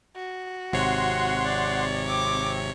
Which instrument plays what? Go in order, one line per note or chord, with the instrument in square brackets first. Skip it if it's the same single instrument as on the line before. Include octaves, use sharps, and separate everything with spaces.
[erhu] F#4
[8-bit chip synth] G#1 C3 C#5 [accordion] F#5 C6
[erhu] D5
[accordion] C4 [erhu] D6